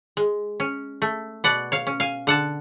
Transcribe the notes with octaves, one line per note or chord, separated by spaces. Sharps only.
G#3
C#4
A3
B2 D5 F#5
C#5 F5
C#4
F5 G#5
D3 F#5 A5